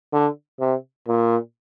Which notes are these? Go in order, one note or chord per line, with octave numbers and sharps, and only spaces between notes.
D3
C3
A#2